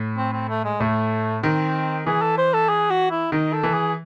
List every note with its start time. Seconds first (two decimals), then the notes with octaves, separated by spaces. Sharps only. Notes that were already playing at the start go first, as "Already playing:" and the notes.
Already playing: A2
0.17 C4
0.33 C4
0.49 A3
0.64 G#3
0.80 A2 A3
1.43 D#3 C4
2.06 E3 G#4
2.22 A4
2.38 C5
2.53 A4
2.69 G#4
2.90 F#4
3.11 E4
3.32 D#3 D#4
3.53 A4
3.63 E3
3.74 G#4